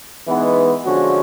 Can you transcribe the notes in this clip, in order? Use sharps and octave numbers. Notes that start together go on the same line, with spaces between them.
E3 G#3 B3 D#4
D3 F3 G#3 C#4 F#4